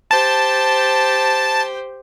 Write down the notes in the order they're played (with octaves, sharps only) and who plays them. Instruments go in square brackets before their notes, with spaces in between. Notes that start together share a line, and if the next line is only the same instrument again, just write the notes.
[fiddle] G4 C5 [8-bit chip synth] A5